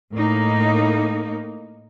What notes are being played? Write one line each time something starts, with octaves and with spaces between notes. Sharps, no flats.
A2 A#3 D#4